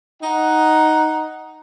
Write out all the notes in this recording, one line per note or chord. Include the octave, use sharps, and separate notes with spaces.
D#4 F#5